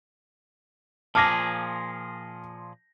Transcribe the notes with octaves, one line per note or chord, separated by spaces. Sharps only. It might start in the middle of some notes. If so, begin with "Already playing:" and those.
A#2 F3 G#4 A5 D6 F6 A#6